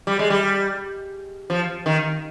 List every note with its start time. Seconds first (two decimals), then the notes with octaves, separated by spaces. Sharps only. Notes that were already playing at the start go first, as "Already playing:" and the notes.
0.07 G3
0.19 G#3
0.30 G3
1.50 F3
1.86 D#3